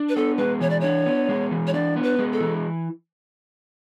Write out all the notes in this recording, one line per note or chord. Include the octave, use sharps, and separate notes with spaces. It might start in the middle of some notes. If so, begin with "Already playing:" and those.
Already playing: D4
B4
B3 A4
G#3 B4
E3 C#5
D5
D4 C#5
B3
G#3
E3
C#5
D4 D5
B3
B4
G#3
A4
E3